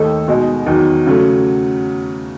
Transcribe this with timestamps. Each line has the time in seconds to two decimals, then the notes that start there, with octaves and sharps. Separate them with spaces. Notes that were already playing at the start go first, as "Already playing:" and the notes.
Already playing: D#2 D#3 A3 D#4 A4
0.28 B2 G#3 D#4
0.66 E2 D#3 F#3
1.06 C#3 F#3 A3